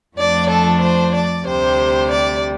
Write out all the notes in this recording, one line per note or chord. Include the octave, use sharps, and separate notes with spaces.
F2 F3 A3 D4 D5
A4
C5
D5
D2 C3 G3 C5
D5